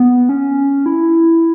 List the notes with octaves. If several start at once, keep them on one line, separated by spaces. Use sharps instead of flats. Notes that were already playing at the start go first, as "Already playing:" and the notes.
Already playing: B3
C#4
E4